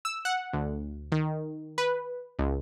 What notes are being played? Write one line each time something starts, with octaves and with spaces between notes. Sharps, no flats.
E6
F#5
D2
D#3
B4
C#2